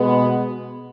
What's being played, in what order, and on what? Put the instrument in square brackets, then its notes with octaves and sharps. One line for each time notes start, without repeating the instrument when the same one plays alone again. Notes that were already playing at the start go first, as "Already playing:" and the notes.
Already playing: [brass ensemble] B2 G#3 B3